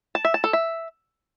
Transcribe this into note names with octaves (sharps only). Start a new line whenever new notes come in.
A5
E5
A5
A4
E5